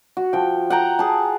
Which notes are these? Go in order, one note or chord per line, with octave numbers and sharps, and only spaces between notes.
F#4
F3 G5
F#5 G5 A#5
G#4 A5